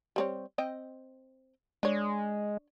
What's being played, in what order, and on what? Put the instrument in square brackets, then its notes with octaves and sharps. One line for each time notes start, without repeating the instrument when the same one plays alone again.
[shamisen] G3 C4 C#5
C4 D#5 G5
[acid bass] G#3 [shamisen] D4 C#5